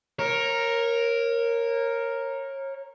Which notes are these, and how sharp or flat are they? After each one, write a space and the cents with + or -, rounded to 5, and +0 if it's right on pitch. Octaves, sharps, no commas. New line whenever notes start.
A#4 +0 C#5 -25